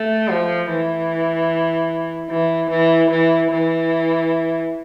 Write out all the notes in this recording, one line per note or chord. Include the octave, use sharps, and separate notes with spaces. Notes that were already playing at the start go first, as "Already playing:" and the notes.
Already playing: A3
F3
E3
E3
E3
E3
E3